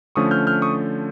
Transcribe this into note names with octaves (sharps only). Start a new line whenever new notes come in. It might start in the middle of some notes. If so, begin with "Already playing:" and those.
D3 F3 A3 C#4 C#6 D#6
F6 G6
F6 G6
C#6 D#6